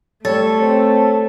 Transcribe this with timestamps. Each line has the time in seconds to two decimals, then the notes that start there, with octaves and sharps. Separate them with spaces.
0.25 G3 A3 A4 C#5
0.60 C4